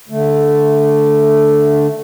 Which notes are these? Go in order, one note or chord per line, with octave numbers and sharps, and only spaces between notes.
D3 A3